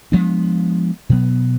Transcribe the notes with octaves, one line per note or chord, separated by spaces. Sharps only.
F3 G#3 B3 D4
B2 F#3 B3